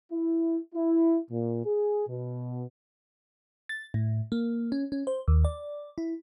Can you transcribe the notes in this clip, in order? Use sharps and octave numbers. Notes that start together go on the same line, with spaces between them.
E4
E4
A#2
G#4
B2
A6
A2
A#3
C#4
C#4
C5
D#2
D5
E4